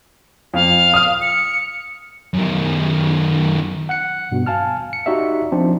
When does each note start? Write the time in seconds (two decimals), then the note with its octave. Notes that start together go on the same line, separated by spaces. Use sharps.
0.54 F2 F5
0.94 D#6 F6
1.21 C#7
2.33 F#2 D#3
3.89 F#5 F#6 C#7
4.32 G2 B2
4.46 F5 G#5 A5 F6
4.93 C#7
5.06 D#4 F#4 G4 D5 E5
5.52 F3 C4 D4 D#4